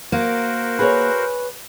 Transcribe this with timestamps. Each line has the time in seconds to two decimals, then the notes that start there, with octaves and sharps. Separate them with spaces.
0.12 A#3 F#4 A#4 C5
0.79 G#4 B4 C#5